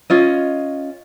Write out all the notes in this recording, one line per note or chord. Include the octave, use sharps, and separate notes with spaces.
C#4 F4 D#5